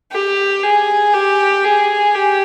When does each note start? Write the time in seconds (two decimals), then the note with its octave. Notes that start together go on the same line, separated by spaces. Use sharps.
0.12 G4
0.63 G#4
1.13 G4
1.65 G#4
2.15 G4